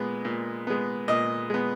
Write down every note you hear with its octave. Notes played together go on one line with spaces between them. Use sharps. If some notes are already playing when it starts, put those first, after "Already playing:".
Already playing: A#2 G#3 B3
A#2
G#3 B3
A#2 D#5
G#3 B3